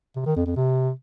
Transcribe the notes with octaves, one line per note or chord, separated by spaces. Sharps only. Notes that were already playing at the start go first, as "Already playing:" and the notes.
C3
D#3
F2
F2
C3